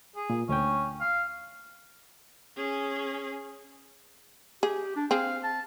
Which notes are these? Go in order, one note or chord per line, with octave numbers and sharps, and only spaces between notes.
G#4
A#2
D2 C#4 G5
F5
C#4 G#4
G4 G#4
D4
C4 G#4 F5
A5